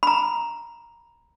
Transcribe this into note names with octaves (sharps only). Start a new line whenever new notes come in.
A#5 B5